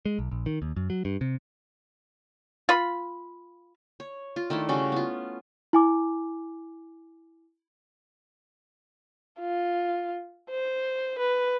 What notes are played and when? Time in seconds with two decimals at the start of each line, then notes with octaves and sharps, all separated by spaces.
0.05 G#3
0.19 B1
0.31 A#1
0.46 D#3
0.62 D#2
0.76 F#2
0.90 F#3
1.05 G2
1.21 C3
2.69 F4 B5
4.00 C#5
4.36 F4
4.50 D#3 A3 D4 E4
4.69 C#3 G3 C#4 F#4
4.92 B3 F4
5.73 E4 G#5 D6
9.40 F4
10.50 C5
11.19 B4